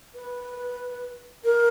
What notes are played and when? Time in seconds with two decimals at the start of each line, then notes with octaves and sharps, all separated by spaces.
0.15 B4
1.44 A#4